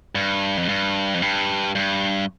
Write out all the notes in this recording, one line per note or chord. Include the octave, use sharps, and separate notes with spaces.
G2
F2
G2
F2
G2
G2